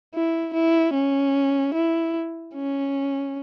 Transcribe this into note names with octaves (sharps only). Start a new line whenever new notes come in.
E4
E4
C#4
E4
C#4